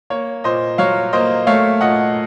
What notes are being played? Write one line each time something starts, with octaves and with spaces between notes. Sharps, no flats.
A#3 C#5
A#2 C5 D#5
F#3 C#5 F5
A#3 C5 D#5
A3 C#5 F5
A#2 D#5 F#5